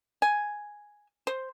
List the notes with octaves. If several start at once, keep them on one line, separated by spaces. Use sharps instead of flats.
G#5
C5